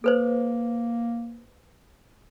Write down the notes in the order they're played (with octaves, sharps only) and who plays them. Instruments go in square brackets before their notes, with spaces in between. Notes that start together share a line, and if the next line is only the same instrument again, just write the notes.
[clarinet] A#3 [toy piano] A4 B4 C5